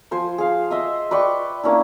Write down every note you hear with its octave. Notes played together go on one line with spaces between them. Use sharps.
F3 C5 G#5
G#4 F5
D#5 E5 D#6
B4 D5 G5 C#6
A#3 C#4 D4 E4